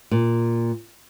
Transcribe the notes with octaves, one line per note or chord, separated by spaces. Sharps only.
A#2